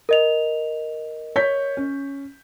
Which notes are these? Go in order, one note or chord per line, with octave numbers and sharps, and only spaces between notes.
A#4 D#5 F7
C#5 G6 B6
C#4